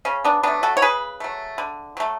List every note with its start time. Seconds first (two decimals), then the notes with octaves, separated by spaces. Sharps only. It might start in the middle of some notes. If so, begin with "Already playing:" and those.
0.05 C#3 C#4
0.24 B3 D4
0.43 F#3 A3 B3 D4
0.63 F#4 A4
0.77 C#5
0.82 C#3 G#4 B4
1.20 F#3 A3
1.58 D3
1.97 F#3 A3